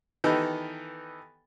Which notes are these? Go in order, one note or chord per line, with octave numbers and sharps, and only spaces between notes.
D#3 E3 B3 D#4 G4 A4